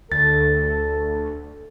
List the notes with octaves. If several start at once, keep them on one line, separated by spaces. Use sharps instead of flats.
D2 A4 A6